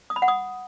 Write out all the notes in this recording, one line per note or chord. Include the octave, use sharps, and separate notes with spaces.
D#6
B5
F#5
D#6